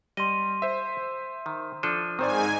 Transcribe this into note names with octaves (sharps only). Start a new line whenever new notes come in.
G3 D#5 C6 D#7
C5 E5
D#3
F3 D4 A4 D#7
G#2 D#3 C4 C5 D5 G#5